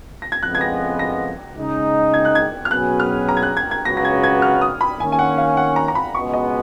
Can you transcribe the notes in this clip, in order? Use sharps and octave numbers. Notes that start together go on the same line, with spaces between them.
A#6
G#6
F2 C#3 G#3 B3 F#6
G#6
A#6
A#6
C#3 G#3 D#4
G#6
F#6
G#6
F6
B2 F#3 C#4 G#4 B4 F#6
F6
A#5
G#6
F#6
G#6
G#6
C#2 C#3 F#3 B3 F#4 A#6
A#6
G#6
G#6
F6
D#6
B5
D#3 A#3 C#4 G#5
G#5
F#5
F5
F#5
A#5
A#5
B5
C#2 B2 G#3 B3 C#6
D#5